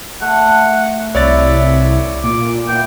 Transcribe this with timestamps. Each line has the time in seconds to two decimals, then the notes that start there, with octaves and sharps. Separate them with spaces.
0.21 A3 F#5
1.15 C2 E4 C#5 D5 E5 A6
2.23 A#2 D6
2.68 B3 E4 G5